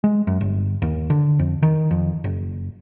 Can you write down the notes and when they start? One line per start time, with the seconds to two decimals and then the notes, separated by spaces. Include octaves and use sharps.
0.04 G#3
0.27 F#2
0.41 G1
0.82 D#2
1.10 D3
1.39 F2
1.62 D#3
1.91 F2
2.24 F#1